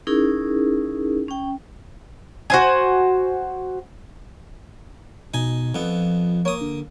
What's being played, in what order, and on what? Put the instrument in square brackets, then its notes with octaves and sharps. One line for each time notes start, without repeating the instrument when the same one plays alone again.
[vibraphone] C#4 D#4 E4 G#4 A#4
C#4 G5
[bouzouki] F#4 C5 G#5
[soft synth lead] B2 [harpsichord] D#4 G#5
[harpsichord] F2 B3 [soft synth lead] F3
[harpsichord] A#3 D#6 [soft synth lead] C#5
[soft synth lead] D3